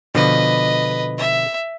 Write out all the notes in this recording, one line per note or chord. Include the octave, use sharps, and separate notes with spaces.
B2 D3 F3 B4 D#5
E5